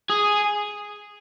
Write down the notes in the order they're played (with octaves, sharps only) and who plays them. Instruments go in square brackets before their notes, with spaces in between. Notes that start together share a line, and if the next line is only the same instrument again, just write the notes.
[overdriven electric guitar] G#4